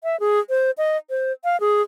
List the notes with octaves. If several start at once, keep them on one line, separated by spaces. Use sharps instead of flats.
E5
G#4
C5
D#5
C5
F5
G#4